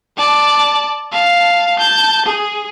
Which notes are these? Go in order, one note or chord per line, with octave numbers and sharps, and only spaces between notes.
D5 A5
F5 A5
A5 G6
G#4